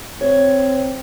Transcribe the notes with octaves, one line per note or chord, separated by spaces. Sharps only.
C4 C#5